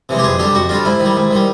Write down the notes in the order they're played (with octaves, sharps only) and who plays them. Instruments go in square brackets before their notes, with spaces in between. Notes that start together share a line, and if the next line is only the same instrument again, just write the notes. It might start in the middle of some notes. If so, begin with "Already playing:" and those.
[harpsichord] C3 E3 G#3
G4
F2 G#4
D3 G3 G4
F2 F#4
D3 G3 F4
G#2 E4
D#3
G3
G#2
D#3 G3